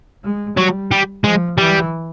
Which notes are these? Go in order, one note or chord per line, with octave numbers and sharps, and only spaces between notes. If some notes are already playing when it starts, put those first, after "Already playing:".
G#3
F#3 G3
G3
F3 G#3
E3 G3